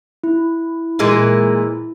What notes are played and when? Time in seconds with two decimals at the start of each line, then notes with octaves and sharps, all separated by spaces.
0.24 E4
0.99 A#2 E3 G#3